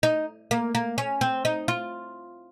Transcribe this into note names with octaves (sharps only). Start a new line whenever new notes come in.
D#4
A#3
A#3
C#4
C4
D#4
F4